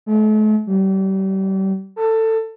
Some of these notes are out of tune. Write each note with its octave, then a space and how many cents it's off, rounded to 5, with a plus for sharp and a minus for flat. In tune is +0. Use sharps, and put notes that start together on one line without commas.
A3 -40
G3 -35
A4 +20